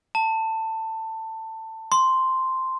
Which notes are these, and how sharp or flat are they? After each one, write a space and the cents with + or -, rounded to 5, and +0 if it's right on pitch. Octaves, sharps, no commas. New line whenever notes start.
A5 +20
C6 -5